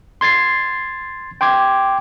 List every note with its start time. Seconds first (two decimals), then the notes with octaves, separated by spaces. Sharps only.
0.21 C6 G#6 A6 C7
1.41 G5 C6 D6 G#6